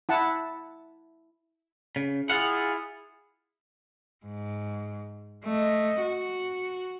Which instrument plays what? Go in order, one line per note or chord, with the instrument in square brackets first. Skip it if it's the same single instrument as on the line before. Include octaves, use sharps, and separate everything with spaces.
[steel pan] E4 F#5 A5
[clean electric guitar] C#3
[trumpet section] E4 G#4 [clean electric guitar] F4 F5 F#5
[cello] G#2
A3 D#5
F#4